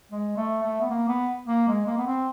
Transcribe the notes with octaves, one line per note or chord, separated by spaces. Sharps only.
G#3
A3
A3
B3
A#3
B3
A#3
G#3
A#3
B3
C4